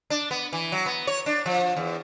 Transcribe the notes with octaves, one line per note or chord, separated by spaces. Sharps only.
D4
B3
E3
F#3
B3
C#5
D4
F3
E2